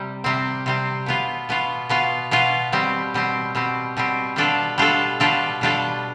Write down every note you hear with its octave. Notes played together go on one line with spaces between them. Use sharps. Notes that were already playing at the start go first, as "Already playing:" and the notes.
Already playing: C3 G3
C3 G3 C4
C3 G3 C4
B2 B3 F4
B2 B3 F4
B2 B3 F4
B2 B3 F4
B2 G3 C4
B2 G3 C4
B2 G3 C4
B2 G3 C4
B2 G3 D4 F4 A4
B2 G3 D4 F4 A4
B2 G3 D4 F4 A4
B2 G3 D4 F4 A4